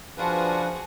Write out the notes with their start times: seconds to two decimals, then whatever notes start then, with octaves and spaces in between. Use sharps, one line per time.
0.17 F3 D4 F4 F#4 G#4 B4